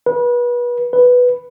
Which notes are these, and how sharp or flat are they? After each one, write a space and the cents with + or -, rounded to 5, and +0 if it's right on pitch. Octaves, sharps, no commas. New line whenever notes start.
B4 -30
B4 +0